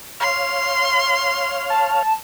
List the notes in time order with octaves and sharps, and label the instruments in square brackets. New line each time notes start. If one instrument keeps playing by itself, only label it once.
[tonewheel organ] C#5 F5 [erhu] C6
[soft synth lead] A5